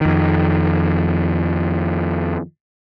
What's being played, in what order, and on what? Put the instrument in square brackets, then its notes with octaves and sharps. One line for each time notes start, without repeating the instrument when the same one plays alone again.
[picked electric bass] F2 D#3